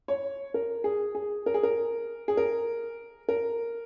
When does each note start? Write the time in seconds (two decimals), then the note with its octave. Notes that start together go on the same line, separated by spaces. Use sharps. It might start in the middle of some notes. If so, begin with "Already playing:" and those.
0.08 C#5
0.54 A#4
0.84 G#4
1.15 G#4
1.46 A#4
1.54 G#4
1.63 A#4
2.28 G#4
2.37 A#4
3.29 A#4